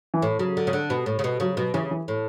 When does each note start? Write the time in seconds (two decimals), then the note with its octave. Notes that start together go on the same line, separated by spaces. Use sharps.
0.14 E3
0.22 A2
0.39 C#3 F#3
0.57 D3
0.67 C#3
0.73 D3
0.90 B2
1.06 A2
1.19 C#3
1.24 B2
1.40 C#3 F#3
1.57 B2 F#3
1.74 C#3 E3
1.91 E3
2.08 A2